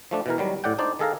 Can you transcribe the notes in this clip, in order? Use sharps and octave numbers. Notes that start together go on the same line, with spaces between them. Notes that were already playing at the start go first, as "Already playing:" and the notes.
F3 A3 D4
B2 E3 A#4
D#3 F#3 G3
A2 D5 F#5 G5
D4 D#4 C5 D5
D#3 G#4 A4 F5 A#5